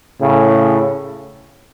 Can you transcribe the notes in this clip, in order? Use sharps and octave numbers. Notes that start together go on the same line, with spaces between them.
A2 C#3